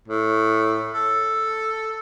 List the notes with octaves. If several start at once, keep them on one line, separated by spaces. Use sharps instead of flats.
A2
A4